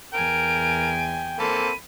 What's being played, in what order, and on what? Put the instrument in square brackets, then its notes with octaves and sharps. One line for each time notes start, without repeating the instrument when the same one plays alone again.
[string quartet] E2 G#5 [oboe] A#4 [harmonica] G5 [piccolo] D7
[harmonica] A#3 C4 A4 [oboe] B5 [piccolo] D#7